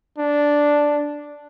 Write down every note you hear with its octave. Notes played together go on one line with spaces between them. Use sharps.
D4